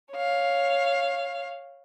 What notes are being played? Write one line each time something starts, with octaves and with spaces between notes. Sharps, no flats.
C#5 F5